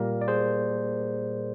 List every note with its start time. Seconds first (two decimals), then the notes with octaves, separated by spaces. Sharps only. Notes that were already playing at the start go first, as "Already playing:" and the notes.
Already playing: A#2 G3 A#3 A#4
0.21 D5
0.28 G#4 C5